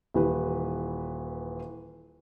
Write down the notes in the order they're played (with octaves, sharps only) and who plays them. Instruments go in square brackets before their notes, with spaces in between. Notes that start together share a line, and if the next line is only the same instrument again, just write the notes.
[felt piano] D#1 E3 B4